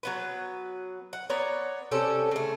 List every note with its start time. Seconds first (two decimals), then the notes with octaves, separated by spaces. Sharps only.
0.03 F#3 B3 B4
1.13 F#5
1.30 B3 C#5 D5 A#5
1.91 C3 G3 C#4 A4
2.31 C#3 A3